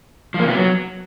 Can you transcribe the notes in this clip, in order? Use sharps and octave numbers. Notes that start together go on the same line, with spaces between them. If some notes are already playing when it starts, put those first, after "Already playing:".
F3
A#3
C3
B3
F#3